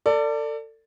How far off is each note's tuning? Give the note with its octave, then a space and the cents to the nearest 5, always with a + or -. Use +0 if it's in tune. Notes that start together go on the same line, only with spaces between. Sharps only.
A4 +35 D5 +0